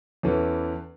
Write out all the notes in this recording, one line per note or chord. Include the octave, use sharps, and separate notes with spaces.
E2 E3 C#4 A4